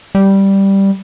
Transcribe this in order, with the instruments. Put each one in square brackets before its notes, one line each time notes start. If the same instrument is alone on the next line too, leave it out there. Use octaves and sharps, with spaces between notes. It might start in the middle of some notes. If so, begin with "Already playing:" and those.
[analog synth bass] G3